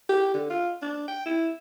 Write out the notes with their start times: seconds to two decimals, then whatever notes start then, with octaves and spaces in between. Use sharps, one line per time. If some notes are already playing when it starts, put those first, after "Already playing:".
0.09 G4
0.34 D3
0.50 F4
0.82 D4
1.08 G5
1.26 E4